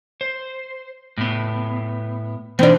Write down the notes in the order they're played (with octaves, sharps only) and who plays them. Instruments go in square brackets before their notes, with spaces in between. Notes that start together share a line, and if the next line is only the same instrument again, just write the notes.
[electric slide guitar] C5
A2 B3
[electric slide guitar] E3 D#4 F4 [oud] C4 D4